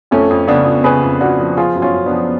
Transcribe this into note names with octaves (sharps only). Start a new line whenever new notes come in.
F2 A3 C#4
F2
C#3 B3 D4
F2
C#3 G#4 B4
F2
F2 D4 F#4
F3
F3 F4 G#4
F#2
C#4 F4
F#2
B3 D4
F3